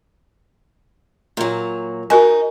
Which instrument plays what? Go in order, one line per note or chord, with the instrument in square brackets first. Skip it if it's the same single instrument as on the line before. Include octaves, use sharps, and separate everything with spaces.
[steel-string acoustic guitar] A#2 F#3
[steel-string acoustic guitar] D#4 [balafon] F#4 A#4 G#5